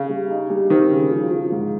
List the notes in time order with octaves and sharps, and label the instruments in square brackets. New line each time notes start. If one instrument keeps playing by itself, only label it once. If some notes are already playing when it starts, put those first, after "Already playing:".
Already playing: [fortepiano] C#3
[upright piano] G3
D#4
G3
[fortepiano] D#3 [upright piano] C4
[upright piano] C#3
F3
F3
G#2